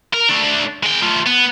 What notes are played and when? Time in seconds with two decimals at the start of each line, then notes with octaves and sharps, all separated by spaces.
0.14 A#4
0.29 A3 D4
0.83 G#3 G5
1.02 A3 F4
1.27 B3